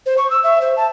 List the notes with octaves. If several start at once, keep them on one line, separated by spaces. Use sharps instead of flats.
C5
C#6
E6
E5
C5
A5